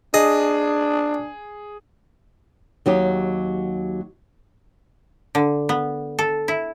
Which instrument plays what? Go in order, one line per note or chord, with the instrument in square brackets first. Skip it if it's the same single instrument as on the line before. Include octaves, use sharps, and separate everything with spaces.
[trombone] D4 [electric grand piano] G#4 [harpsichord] D#5
[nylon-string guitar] D#2 F#3 D#4 G4
[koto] D3
B3
A4
E4